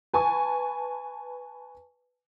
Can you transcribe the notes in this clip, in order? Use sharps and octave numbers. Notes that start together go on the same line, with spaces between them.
B4 G#5 A5 C#6